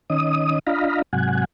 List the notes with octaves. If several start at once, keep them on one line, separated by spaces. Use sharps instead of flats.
D#3 C#4 D#5 D#6
D4 F4 D#5 F5 A#5 B5
G#2 C3 F#3 F#5 G#5